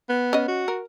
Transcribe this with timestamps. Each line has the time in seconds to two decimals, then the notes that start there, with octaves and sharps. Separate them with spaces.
0.09 B3
0.33 C#4 D#5
0.48 F#4
0.68 A#4